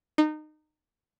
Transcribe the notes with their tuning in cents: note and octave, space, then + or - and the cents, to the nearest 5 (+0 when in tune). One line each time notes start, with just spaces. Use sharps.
D#4 -25